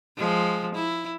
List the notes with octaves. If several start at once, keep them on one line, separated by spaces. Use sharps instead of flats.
F3 G#3
E4